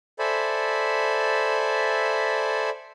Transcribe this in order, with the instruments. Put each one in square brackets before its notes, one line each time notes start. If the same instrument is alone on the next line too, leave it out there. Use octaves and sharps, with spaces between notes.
[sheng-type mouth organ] A4 C5 D5 E5 G#5 B5